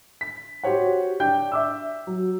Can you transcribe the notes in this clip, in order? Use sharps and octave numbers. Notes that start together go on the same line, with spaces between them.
B6
F#4 G4 C5 C#5 F#5
D4 G5 G6
E5 D6 E6
F#3